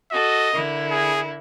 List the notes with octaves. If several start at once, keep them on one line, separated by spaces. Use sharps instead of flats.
F#4 A4 D#5
D3 E4 A#4
G#4